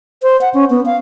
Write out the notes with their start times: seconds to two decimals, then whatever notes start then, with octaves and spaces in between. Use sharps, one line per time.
0.23 C5
0.41 F#5
0.54 C#4
0.70 B3
0.86 F5